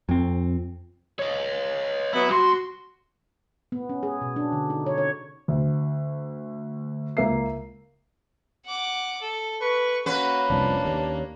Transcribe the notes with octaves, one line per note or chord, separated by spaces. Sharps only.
F2 C4
C#5 D#5
F#3 B3 E4
C2 F#4 C6
B3
C#4
G#4
B2
D4
D3
D#4
C#5
C#5
D2
C#2 A#3 E5 C7
F#5 D6
A4
B4 C#6
A#3 C#4 F#4 B4
F1 C2 F3 D4
D#2